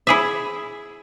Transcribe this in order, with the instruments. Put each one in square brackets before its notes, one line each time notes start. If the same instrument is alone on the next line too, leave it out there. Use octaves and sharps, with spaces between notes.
[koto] E4 G#4 E5